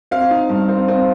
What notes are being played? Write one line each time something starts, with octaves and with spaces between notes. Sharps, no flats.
C4 F5
D#4
G2
C4
C4